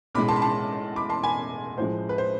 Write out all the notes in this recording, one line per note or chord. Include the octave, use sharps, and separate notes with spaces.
B1 A2 G#3 B5 D6
A5 C6
B5
A5 C6
B5 D6
A5 C6
G#5 B5
A1 A2 F3 G#3 C5
B4
C5